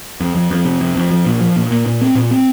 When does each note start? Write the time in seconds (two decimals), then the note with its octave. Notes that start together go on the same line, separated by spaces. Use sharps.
0.20 F2
0.35 F2
0.51 F2
0.65 C3
0.81 F2
0.96 F2
1.11 F3
1.26 A#2
1.41 F3
1.56 A#2
1.71 A#2
1.86 A#2
2.01 C4
2.15 A#2
2.31 C4